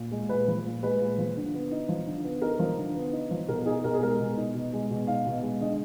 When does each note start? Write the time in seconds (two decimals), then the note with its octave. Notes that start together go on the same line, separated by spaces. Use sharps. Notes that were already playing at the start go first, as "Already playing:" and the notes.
Already playing: A#2
0.11 G#3
0.29 A#2 B4
0.48 F3
0.66 A#2
0.83 G#3 B4
1.00 A#2
1.18 F3
1.37 D3
1.54 B3
1.71 D#4
1.89 F3
2.07 D3
2.24 B3
2.42 D#4 A#4
2.59 F3
2.78 D3
2.95 B3
3.13 D#4
3.31 F3
3.48 B2 A#4
3.66 D#4 G#4
3.84 B2 A#4
3.93 G#4
4.02 G#3 A#4
4.20 B2
4.37 D#4
4.55 B2
4.73 G#3
4.90 B2
5.07 D#4 F5
5.26 B2
5.43 G#3
5.61 D3 D#5